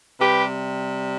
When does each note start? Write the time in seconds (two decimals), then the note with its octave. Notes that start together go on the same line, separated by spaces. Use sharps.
0.20 C3 G3 G4 B4